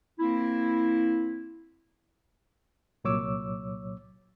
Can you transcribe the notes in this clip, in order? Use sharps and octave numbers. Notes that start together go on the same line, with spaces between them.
A#3 C4 E4
C2 A#2 F#3 C#5 D6 E6